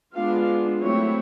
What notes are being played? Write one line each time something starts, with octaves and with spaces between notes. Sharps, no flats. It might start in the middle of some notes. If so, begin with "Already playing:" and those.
G#3 B3 D4 F4 F5
F#3 A3 C4 E4 C#5